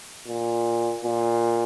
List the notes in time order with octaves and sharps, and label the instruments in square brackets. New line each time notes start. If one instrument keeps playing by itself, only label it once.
[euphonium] A#2
A#2